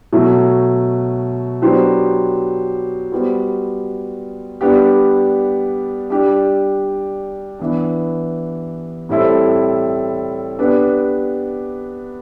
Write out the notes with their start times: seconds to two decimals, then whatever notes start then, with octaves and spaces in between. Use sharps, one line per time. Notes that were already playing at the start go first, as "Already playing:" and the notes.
0.13 B2 F#3 A3
1.62 F#3 B3 D4 G4 C5
3.12 G3 B3 F#4 C5
4.61 G3 B3 D4 G4
6.10 G3 D4 G4
7.59 E3 B3 D4
9.09 A2 G3 C4 E4 A4
10.59 B3 D4 G4 B4